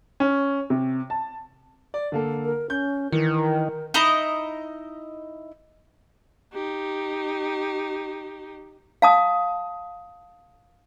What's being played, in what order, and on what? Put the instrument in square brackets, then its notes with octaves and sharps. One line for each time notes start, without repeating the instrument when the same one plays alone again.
[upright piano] C#4
C3
A5
[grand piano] D5
D3 A#3 A4
[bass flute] A#4
[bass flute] C#4 [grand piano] G6
[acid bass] D#3 [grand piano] E3 C#7 [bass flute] A#4
[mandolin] D#4 E4 D#5 A#5
[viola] D#4 G4
[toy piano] F5 A5 D#6